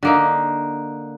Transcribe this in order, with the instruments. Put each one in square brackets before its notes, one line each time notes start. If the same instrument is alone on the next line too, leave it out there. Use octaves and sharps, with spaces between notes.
[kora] D3 A#3 D#4